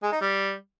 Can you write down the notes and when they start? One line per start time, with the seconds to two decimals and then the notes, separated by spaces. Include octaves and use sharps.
0.02 G#3
0.12 D#4
0.21 G3